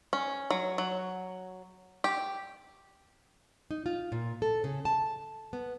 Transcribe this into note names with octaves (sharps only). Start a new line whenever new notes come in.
C#4
F#3
F#3
G4
D#4
F4
A#2
A4
C#3
A5
B3